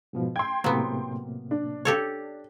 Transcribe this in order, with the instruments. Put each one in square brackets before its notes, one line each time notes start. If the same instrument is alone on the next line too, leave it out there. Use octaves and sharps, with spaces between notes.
[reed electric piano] G#2 B2 F3
[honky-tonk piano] G5 C6 [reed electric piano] G#6
[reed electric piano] A2 C3 A#3 [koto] F#3 B3
[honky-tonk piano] D4
[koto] G4 A4 C#5